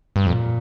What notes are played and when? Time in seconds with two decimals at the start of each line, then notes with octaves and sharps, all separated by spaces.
0.16 G2
0.26 F2 A#2